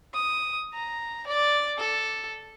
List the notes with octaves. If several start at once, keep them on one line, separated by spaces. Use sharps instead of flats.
D#6
A#5
D5
A4